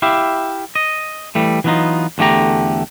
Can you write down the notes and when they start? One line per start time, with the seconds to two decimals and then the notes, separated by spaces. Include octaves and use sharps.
0.02 E4 G4 E5 F5
0.76 D#5
1.35 E3 G3 A3
1.64 E3 F#3 B3 C4 D#4 F4
2.18 E2 D3 A3 G4 A#5